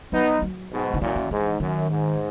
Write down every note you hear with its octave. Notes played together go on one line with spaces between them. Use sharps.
F#3 B3 D#4
F#3
G#2 B2
D#3
F#2 A#2 E3
E3
G#2 E3
F#2 D#3
G#2